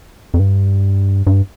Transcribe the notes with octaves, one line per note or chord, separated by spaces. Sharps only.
F2
G2
G2